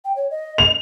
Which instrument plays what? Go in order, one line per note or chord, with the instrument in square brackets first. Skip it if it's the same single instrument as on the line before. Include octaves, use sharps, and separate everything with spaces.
[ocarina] G5
C#5
D#5
[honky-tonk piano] F7